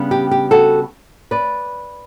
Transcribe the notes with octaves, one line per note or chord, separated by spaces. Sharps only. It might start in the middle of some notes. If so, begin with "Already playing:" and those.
Already playing: C#3 G3 B3 D4
G4
G4
F#4 A4
B4 D5